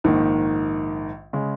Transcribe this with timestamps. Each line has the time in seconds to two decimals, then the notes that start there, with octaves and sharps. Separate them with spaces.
0.04 A#1 G#2 D#3
1.33 C#3 G#3